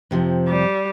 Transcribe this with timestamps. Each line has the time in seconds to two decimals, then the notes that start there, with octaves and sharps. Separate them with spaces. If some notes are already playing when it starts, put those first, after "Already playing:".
0.11 F2 C3 F3
0.48 G3